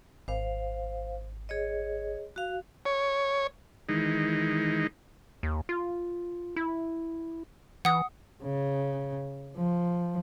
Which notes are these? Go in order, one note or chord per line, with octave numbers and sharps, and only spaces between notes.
G#1 C5 F5
G#4 C#5 D#5
F#4 F5
C#5
D#3 E3 G#3 D#4
D#2
F4
E4
E3 F#5 D#6
C#3
F3